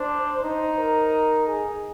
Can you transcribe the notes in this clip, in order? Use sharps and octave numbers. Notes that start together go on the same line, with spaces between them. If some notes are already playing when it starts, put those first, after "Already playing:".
Already playing: D4 C5
D#4 C5
A#4
G#4